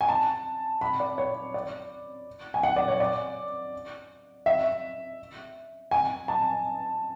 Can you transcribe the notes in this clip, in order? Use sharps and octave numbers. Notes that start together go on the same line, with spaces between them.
G#5
A5
B5
D5
C#5
D5
G#5
F#5
D5
C#5
D5
E5
G#5
A5